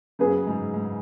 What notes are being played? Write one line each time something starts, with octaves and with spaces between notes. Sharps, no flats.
F#2 C#3 B3 G#4 B4
G#2
G#2